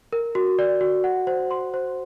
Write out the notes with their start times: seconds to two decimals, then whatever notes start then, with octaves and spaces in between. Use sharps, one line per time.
0.13 A#4
0.35 F#4
0.59 D5
0.81 F#4
1.04 F#5
1.27 C5
1.51 C6
1.74 C5